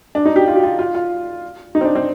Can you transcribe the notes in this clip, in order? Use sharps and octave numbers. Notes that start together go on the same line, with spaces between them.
D4
D#4
G4
F4
G4
F4
F4
F4
D#4
C4
D4
C4